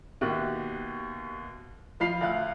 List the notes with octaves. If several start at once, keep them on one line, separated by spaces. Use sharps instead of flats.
D#2 B2 F#4 G4 E5 F#6
F3 F4 B5 C7 F7
D2 F5 F#6